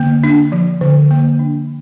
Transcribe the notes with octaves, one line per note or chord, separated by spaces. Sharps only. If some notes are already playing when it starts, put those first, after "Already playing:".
Already playing: D3 A#3
D4
F3
D3
A#3
D4